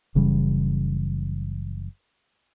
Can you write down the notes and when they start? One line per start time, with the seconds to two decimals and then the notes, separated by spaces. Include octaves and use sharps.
0.15 F#1 C#3 E3 G3